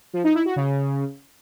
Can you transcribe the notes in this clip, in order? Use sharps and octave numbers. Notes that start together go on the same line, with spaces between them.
F3
D#4
E4
F#4
C#3